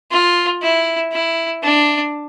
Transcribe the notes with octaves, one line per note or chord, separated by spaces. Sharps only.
F4
E4
E4
D4